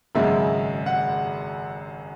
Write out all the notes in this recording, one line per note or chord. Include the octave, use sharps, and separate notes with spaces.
G#1 F#2 C#3 G#3 E5
F#5